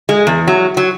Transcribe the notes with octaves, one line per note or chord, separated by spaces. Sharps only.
G#3
E2
F#3
F#3